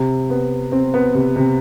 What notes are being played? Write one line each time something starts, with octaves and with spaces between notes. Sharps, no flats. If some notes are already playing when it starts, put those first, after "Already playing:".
Already playing: C3
B3
C4
B3
C3
C3